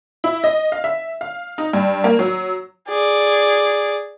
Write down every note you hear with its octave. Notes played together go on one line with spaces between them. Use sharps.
E4
D#5
F5
E5
F5
D#4
G2
A#3
F#3
G#4 D5